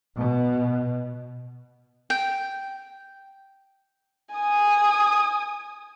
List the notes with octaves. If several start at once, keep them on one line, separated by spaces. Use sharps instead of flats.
B2
G5
G#5 D#6